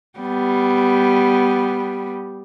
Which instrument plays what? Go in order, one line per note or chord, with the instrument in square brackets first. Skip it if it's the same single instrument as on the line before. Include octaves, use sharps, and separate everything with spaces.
[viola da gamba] G3 B3